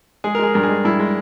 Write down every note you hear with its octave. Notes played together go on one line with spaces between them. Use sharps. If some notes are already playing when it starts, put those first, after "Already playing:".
G#3 G#4
A#4
G#3 G#4
G2 A#4
G#4
G#3
G2 E4
G#3